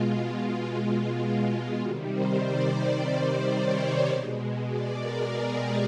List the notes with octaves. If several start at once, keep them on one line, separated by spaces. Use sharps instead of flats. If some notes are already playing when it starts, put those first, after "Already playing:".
Already playing: B2 G#3 F4
F4
C3 D#3 G3 F#4
C5
D5
C#5
B2 G#3
D5
A#4
G#4
G4